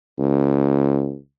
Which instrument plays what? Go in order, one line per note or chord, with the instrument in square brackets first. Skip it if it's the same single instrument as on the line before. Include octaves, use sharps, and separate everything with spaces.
[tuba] C#2